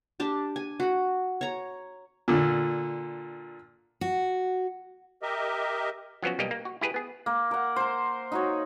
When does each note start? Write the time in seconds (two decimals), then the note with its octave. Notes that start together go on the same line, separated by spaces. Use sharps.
0.20 D4 G4 A5
0.56 G#5
0.80 F#4 F#5
1.41 C#5 A#5
2.28 A#2 D3
4.01 F#4
5.22 G4 A#4 D#5 E5
6.22 F3 F#3 B3 C#4 F#4
6.39 B1 G3 A#3 G4 D#5
6.51 A#3
6.65 F#4
6.81 E4 G4 G#4 B4
6.94 B3 G#4
7.26 A#3
7.51 A#4 F#5
7.76 A#4 C5
8.32 D#4 F#4 C#5